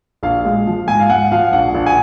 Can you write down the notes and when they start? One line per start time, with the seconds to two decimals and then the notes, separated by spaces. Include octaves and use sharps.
0.23 A#1 F5
0.45 G#3
0.67 F3
0.88 G#2 G#5
1.00 F5
1.10 G#2 F#5
1.32 F3 F5
1.53 A#1 F#5
1.75 A#1
1.86 G#5